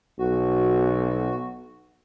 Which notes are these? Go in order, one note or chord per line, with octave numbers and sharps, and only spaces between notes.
B1 F#4